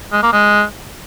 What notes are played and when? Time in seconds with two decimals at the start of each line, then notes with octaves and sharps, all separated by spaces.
0.12 G#3
0.23 A#3
0.33 G#3